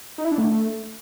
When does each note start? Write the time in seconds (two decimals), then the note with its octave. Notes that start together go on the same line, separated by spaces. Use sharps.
0.18 D#4
0.25 E4
0.31 D4
0.38 A3